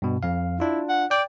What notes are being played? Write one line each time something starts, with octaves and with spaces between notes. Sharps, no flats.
G2 B2
F2 F5
D4 E4 F4
F#5
D5 G5